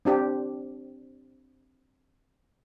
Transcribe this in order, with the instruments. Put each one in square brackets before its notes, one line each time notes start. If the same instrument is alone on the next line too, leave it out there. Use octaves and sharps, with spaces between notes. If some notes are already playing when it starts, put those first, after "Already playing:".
[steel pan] C4 D4 G4